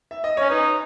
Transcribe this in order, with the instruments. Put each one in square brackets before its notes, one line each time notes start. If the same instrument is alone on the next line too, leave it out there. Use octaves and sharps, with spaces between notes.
[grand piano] E5
D#5
[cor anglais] C#4 [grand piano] C#5
[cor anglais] D#4 [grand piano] B4